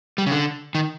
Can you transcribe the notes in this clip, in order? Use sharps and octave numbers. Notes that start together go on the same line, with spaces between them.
G3
C#3
D3
D#3